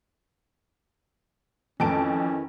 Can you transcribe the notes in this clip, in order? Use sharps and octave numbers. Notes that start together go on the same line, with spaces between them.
F2 D#3 E3 A3 C#4 A5 D7